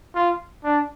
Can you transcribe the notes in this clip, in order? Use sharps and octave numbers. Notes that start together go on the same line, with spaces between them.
F4
D4